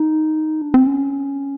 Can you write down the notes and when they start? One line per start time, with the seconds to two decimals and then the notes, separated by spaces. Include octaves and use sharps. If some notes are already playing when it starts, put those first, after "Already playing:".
Already playing: D#4
0.62 D4
0.74 C4
0.87 C#4